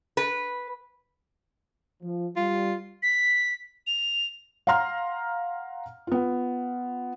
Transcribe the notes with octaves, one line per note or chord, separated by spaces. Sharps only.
B4
F3
G3 F4
B6
F7
F5 F#5 A#5 C6 F6
B3 F4